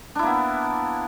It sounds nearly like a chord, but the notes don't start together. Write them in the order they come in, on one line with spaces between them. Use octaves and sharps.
D4 E4 A#3 B3